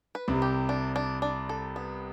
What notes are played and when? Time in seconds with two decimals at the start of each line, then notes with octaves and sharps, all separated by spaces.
0.15 B4
0.28 C2 C3
0.42 G4
0.69 D4
0.96 D4
1.22 D4
1.49 A4
1.76 B3